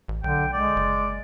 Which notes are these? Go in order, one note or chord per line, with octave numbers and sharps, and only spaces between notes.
A1
B1 D3 G5
G#3 D5
F#1